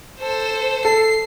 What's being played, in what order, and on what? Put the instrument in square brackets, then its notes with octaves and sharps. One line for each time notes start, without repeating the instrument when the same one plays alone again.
[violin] A4 C5
[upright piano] A4 [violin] C7